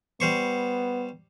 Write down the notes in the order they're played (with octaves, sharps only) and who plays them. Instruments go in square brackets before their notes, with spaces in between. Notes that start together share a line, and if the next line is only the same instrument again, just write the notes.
[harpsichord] G3 C5 C#6 [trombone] B3